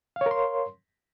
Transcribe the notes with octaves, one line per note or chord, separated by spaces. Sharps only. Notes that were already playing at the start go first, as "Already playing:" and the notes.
A#4 C#5 F5 C6